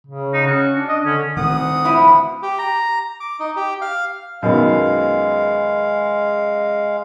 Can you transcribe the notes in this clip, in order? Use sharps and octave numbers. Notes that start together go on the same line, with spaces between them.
C#3
D#4
C#4 F#4
D4
D#5
D3 C#4
D2 D#3 A3 C4 F#5 D#6
B2 F3 E4
G4
A#5
D6
D#4
G4
F5
F#2 B2 D#3 G#3 F5